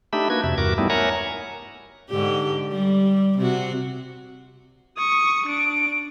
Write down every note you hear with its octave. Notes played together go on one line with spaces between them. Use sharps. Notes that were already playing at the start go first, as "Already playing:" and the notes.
A3 D4 D#4 G4 E5 B5
A#3 F#4 B4 G#6
F2 C3 E5
E2 G2 F#4 A#4 D6
G3 A3 B3 D#4 E4
A#4 C#5 E5 F#5 G#5 A#5
G#2 D3 G4
G3
C3 F#4
C#6 D#6
D4 D7